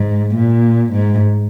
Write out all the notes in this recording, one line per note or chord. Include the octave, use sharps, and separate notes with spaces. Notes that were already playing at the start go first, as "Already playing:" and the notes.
Already playing: G#2
A#2
G#2